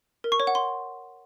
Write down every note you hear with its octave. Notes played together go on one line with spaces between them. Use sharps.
A#4
C#6
C#5
F#5
C6